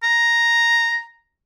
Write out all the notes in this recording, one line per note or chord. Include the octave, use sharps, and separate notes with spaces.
A#5